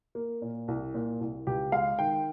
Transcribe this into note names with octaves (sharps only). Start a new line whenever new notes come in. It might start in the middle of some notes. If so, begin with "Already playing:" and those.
A#3
A#2
C2
A#2
C2
C#2 G4
G#3 F5
D#3 G5